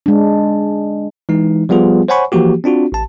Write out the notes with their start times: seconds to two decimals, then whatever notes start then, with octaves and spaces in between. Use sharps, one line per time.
0.06 G#3 D4
1.29 E3 G#3 D#4
1.69 F3 G3 B3 F4 G#4
2.08 C5 C#5 F#5 G#5 B5 C#6
2.32 E3 F3 A#3 F#4 G4
2.64 C4 D4 F4 F#4
2.92 A1 A5